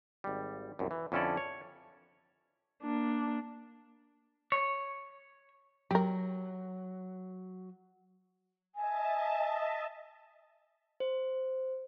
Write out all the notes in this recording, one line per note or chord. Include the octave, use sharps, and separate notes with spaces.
G#1 G3
C2 F#2
E3
F2 D3 C#4 E4 A4 D5
C#5
A#3 D4
C#5
F#3 G4 A#4
D#5 E5 G#5 A5
C5